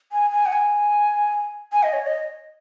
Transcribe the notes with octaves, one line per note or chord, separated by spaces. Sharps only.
G#5
G#5
F#5
G#5
G#5
D#5
C#5
D#5